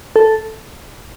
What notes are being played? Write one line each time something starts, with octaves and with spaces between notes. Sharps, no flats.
A4